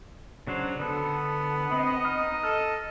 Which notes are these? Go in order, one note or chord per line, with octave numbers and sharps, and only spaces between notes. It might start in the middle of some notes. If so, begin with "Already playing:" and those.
C#3 F#3 D4 C5
D3 B3 A4
C4 D#5 B5
D#4 A#5 F6
A4 F6